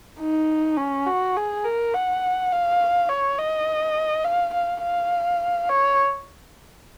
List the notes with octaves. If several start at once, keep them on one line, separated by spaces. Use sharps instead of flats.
D#4
C#4
F#4
G#4
A#4
F#5
F5
C#5
D#5
F5
F5
F5
C#5